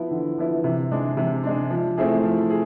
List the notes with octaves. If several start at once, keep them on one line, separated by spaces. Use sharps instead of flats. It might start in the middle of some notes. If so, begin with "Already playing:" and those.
Already playing: F3 B3 E4
D3
F3 B3 E4
C3
G#3 D4
C3
G#3 D4
F3
A3 C4 E4 G#4
F3
G#4